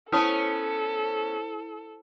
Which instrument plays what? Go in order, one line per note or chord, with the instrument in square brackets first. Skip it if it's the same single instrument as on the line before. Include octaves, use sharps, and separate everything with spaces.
[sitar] B3 C#4 [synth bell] E4 C5 [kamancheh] A4 [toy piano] B4 A5 D#6